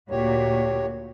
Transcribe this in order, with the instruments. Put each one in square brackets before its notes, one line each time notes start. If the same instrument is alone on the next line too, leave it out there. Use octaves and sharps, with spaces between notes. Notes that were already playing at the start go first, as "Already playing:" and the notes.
[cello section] D2 A#2 F#4 [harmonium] G4 C#5